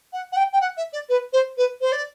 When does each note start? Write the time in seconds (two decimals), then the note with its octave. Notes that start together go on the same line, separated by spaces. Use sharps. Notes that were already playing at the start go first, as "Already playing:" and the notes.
0.13 F#5
0.32 F#5
0.36 G5
0.52 G5
0.61 F#5
0.77 E5
0.92 D5
1.09 B4
1.32 C5
1.57 B4
1.81 C5
1.92 D5